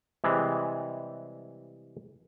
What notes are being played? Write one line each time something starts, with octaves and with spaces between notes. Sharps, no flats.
C3 E3 G3 G#3